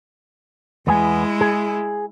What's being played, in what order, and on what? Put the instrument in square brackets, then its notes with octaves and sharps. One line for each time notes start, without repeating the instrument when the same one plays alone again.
[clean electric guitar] E2 B3 G#5 [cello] G#3 E4
[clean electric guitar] G#4